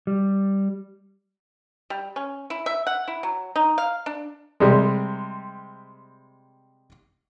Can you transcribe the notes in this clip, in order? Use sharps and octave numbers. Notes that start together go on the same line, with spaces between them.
G3
G3
C#4
E4
E5
F#5
E4
F#3
D#4
F5
D4
C3 G3 G#3